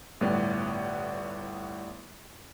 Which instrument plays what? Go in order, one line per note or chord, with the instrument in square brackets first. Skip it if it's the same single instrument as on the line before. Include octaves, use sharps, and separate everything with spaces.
[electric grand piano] G1 A2 G3 B3 D5